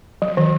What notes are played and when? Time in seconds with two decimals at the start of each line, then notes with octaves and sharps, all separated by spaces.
0.22 F#3
0.37 D#3